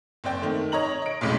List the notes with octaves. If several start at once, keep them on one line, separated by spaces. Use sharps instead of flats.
F#1 C4 D5 G5
D#3 A3
C#5 D#5 A#5 F#7
D#5 D7
B1 F2 A2 G#3 C#4